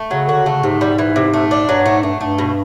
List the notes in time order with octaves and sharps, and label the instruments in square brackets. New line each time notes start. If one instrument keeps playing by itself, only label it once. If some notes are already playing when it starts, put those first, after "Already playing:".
Already playing: [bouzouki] A3
[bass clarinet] C#3 [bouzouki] F#3
[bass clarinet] D3 [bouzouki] F#4
[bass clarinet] C#3 [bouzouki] A3
[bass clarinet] G#2 [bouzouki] C3
[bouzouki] G3
E3
C3
A3
D4
[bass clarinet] G2 [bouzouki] F#3
[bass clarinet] G#2 [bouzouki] A3
[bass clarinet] G2 [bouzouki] A3
[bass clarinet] G2 [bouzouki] A3
[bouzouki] B2